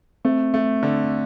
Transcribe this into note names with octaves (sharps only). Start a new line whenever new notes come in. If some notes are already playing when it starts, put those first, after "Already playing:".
A3 C4
A3
D3